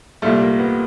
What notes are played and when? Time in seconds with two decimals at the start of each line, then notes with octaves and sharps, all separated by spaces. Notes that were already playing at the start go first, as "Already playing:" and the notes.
0.22 C2 A#2 G3 A3
0.41 A#3
0.59 B3